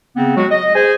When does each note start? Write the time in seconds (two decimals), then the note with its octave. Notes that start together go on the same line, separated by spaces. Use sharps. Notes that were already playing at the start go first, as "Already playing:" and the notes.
0.16 C#3 B3 C4
0.37 F#3 G#3 F#4
0.51 D#5
0.75 G#4 C5 G#5